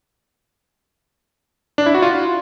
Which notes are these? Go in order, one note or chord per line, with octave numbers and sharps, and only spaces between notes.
D4
E4
F#4
F4